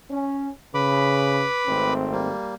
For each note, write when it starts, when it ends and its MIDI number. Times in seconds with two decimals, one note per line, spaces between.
0.11 0.51 61
0.74 1.46 49
0.74 1.94 71
0.74 1.94 83
0.74 1.94 86
1.67 2.33 32
1.67 2.33 57
1.67 2.33 60
2.12 2.55 55
2.12 2.55 58